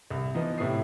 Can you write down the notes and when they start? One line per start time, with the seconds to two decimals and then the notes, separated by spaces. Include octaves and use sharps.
0.10 C2
0.35 E3 F3 B3 D#4
0.58 A2 C3 E4 A4 D#6 C7